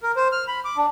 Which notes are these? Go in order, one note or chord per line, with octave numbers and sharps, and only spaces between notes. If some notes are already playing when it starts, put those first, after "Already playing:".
A#4
C5
F6
B5
D6
D4